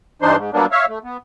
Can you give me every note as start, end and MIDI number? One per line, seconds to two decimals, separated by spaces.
0.22 0.36 43
0.22 0.36 52
0.22 0.36 62
0.22 0.36 63
0.22 0.36 72
0.22 0.36 84
0.37 0.50 44
0.53 0.66 54
0.53 0.66 55
0.53 0.66 58
0.53 0.66 59
0.53 0.66 62
0.72 0.85 73
0.72 0.85 76
0.72 0.85 77
0.88 0.99 57
1.04 1.17 59